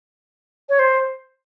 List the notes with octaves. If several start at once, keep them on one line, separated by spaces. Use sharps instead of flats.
C#5
C5